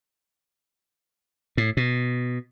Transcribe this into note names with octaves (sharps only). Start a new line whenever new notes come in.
A2
B2